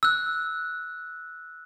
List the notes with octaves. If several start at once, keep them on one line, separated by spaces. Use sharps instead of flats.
E6 F#6